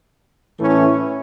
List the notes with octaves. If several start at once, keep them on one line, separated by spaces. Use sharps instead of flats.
A2 E3 A3 C#4